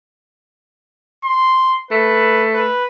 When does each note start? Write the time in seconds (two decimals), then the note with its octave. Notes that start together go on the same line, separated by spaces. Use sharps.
1.24 C6
1.91 A3 B4
2.54 B4